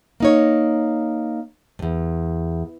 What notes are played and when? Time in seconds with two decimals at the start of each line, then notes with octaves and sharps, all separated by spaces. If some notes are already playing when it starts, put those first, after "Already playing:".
0.20 A#3 D#4 C#5
1.79 E2 G2